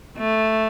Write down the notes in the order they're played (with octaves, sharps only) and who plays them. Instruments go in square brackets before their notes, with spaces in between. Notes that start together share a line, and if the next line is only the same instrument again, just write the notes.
[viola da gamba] A3